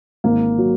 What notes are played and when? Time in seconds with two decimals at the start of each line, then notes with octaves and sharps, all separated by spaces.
0.24 G#1 A#3
0.58 F#3